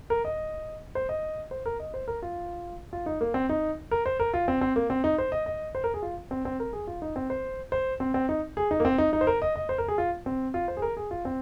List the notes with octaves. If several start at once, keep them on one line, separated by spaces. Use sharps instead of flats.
A#4
D#5
C5
D#5
C5
A#4
D#5
C5
A#4
F4
F4
D#4
A#3
C4
D#4
A#4
C5
A#4
F4
C4
C4
A#3
C4
D#4
C5
D#5
D#5
C5
A#4
G#4
F4
C4
C4
A#4
G#4
F4
D#4
C4
C5
C5
C4
C4
D#4
G#4
D#4
A#3
C4
D#4
D#4
C5
A#4
D#5
D#5
C5
A#4
G#4
F4
C4
F4
C5
G#4
A#4
G#4
F4
C4